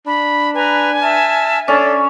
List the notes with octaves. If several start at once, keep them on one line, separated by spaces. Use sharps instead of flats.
D4 B5
B4 G#5 A#5
E5 A5 F6
C#4 D4 A4 D5